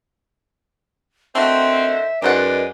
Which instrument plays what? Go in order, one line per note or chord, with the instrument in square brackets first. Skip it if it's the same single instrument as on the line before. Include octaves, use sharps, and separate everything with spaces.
[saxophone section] D3 D#3 C5 [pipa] A3 F#4 [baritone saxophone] C4 [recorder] E5
[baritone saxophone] F#2 [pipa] D#3 C5 F#5 [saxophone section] G#3 D5 [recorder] B4